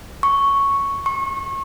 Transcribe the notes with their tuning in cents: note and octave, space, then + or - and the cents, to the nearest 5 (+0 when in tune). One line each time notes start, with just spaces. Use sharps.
C#6 +0
C#6 -30